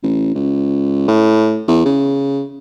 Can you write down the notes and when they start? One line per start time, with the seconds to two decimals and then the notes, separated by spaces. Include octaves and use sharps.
0.03 A1
0.35 C#2
1.08 A2
1.68 E2
1.85 C#3